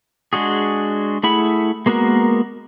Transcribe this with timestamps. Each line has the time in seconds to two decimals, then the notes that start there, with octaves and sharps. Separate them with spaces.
0.33 G#3 D4 F#4 G#4
1.23 A3 E4 G#4 F#5 B5
1.86 G#3 A#3 B3 F#4 A#4